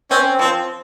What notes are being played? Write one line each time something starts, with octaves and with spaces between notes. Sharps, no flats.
C4 C#4
F3 C4